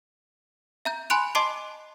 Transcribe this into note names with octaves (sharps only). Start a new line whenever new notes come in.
E5 A#5 G6
G#5 B5 C6 F#6 D7 F7
D#5 A5 C6 D6 C7 D7